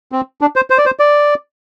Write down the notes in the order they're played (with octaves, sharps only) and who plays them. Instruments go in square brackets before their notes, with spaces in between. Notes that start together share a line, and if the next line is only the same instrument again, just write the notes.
[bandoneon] C4
D4
C5
C5
D5
C5
D5